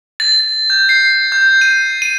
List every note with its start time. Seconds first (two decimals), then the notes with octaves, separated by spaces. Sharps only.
0.20 A6
0.70 G6
0.89 C7
1.32 G6
1.61 D#7
2.02 D#7